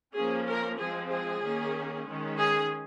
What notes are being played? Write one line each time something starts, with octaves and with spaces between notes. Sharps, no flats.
F3 A#3 C#4 G#4
A#4
F3 G#3 C4 G#4
G#4
D#3 A#3 C#4
D#3 G#3 C#4
G#4